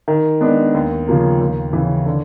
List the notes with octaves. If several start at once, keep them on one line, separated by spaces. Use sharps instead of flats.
D#3
G#3 B3 D4
D#2
C#3 F3 A#3
D#2
C#3 E3
D3